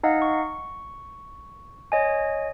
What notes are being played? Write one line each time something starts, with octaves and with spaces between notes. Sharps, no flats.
D#4 D#5 F5 F#5
C#6
C#5 D#5 G#5